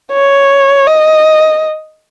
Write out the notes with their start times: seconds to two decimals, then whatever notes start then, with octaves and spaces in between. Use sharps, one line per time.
0.12 C#5
0.86 D#5